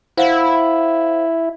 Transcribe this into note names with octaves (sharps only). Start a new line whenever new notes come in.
E4 C5 F5 F#5